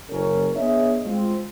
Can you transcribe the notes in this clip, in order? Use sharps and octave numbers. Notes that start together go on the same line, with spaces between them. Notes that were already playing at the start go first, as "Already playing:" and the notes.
F#1 C#4 A#4
B3 D4 G#4 C#5 D#5 E5
G#3 C4 F4